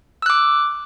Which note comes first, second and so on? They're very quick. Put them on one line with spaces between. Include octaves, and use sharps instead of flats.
E6 F#6 D6